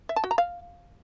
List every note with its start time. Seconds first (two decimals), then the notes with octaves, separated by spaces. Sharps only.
0.09 E5
0.16 A5
0.24 F#4
0.31 A#5
0.38 F5